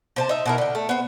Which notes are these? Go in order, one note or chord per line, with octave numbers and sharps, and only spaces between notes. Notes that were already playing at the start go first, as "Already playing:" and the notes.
C3 C5 A5
D#4 E5
B2 E4 A#4
D3 G5
A3
B3 C5